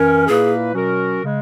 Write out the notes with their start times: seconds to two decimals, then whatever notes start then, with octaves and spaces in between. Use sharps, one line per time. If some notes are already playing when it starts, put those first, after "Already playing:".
Already playing: F#2 E3 C#4 A#4
0.27 A#2 A#3 E4 G#4 B4
0.74 B2 F#3 C#4 F#4 A#4
1.23 C#3 G#3